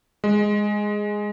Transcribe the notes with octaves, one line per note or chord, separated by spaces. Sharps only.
G#3